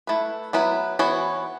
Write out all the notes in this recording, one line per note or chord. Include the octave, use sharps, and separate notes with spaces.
A3 E4 B4
F#3 B3 E4 B4
E3 B3 F#4 C#5